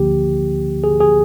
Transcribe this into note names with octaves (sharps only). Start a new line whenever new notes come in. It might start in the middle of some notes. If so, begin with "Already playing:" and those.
Already playing: D2 D3 F3 A#3 G4
G#4
G#4